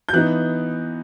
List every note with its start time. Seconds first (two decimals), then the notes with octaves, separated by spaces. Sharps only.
0.09 G6
0.13 E3 B3 D#4 F#6